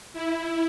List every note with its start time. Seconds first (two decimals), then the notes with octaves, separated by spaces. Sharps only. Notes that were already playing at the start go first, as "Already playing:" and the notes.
0.13 E4